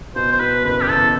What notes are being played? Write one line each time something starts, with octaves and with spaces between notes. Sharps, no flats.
B2 C5
C5
B2 B4
F#1 B4
G4
E2 A4